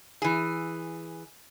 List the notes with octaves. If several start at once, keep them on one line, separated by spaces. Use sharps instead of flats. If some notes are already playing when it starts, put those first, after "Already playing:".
E3 G#4